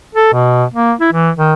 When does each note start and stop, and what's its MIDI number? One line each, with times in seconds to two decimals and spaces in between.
0.14 0.29 69
0.32 0.64 47
0.74 0.93 58
1.01 1.10 64
1.12 1.30 52
1.36 1.54 51